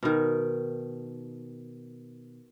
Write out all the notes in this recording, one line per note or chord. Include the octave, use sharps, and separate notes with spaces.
B2 D#3